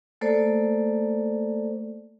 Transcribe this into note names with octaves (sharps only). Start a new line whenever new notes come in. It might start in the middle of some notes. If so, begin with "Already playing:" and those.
A3 A#3 A4 C5 D5